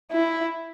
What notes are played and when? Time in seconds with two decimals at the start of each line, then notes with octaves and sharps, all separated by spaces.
0.12 E4